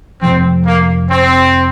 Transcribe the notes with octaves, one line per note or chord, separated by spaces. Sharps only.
F2 C3 F3 G#3 C4
A#3
C4